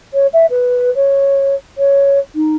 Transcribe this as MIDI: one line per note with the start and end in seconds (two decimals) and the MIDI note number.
0.14 0.27 73
0.33 0.46 76
0.50 0.90 71
0.95 1.55 73
1.78 2.19 73
2.35 2.56 63